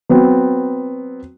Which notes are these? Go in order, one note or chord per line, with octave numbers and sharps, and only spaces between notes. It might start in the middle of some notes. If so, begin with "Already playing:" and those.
F#3 B3 C4